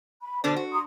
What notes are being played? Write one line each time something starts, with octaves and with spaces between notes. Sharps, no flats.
B5
B2 D3 D4 C5
F#4
A#5 C6 D#6